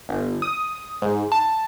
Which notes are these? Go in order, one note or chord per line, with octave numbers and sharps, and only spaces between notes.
G1
D#6
G#2
A5